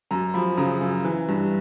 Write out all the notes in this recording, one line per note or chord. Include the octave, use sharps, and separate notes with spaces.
F#2 A#5
F3 B5
C#3 A#5
F#2
E3
G2